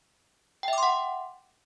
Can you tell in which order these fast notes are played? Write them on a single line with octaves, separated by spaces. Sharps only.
G5 E5 D6 C6 F#5